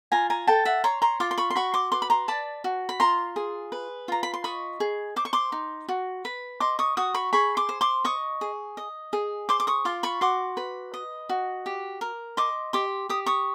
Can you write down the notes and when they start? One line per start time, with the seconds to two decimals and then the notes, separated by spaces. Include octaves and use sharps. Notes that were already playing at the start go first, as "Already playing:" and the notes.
0.12 F4 G#5 A#5
0.30 G#5 A#5
0.47 A4 G5 A5
0.65 E5 F#5
0.84 C#5 A#5 C6
1.02 A#5 C6
1.20 F4 C6 D6
1.31 C6
1.38 B5 C#6
1.50 C6
1.56 F#4 B5 C#6
1.74 C6 D6
1.92 B4 C6 D6
2.02 B5
2.10 A#5 C6
2.28 D5 A5 B5
2.64 F#4
2.89 B5
3.00 F4 A#5 C6
3.36 G#4
3.72 B4
4.08 F4 A#5
4.23 B5
4.34 C6
4.44 D#5 B5 C#6
4.80 G#4
5.16 C5 D6
5.25 C#6
5.33 C6 D6
5.52 D#4
5.89 F#4
6.25 B4
6.60 D#5 C6 D6
6.79 C#6 D#6
6.97 F#4 C#6 D#6
7.14 B5 C#6
7.33 G#4 B5 C#6
7.57 C6 D6
7.69 C5
7.81 C6 D6
8.05 D#5 C#6 D#6
8.41 G#4
8.77 D#5
9.13 G#4
9.49 C5 C6 D6
9.60 D6
9.67 C#6 D#6
9.85 F4 C6 D6
10.03 B5 C#6
10.21 F#4 C6 D6
10.57 B4
10.94 D#5
11.29 F#4
11.66 G4
12.01 A#4
12.37 D#5 C6 D6
12.73 G4 C6 D6
13.09 G4 D#6
13.26 C#6 D#6